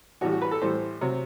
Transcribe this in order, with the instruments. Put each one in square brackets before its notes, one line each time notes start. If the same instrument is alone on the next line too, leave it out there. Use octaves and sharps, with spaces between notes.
[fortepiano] A2 E3 G3 F#4
F#4
B4
A4
A2 E3 G3 C5
C3 F#3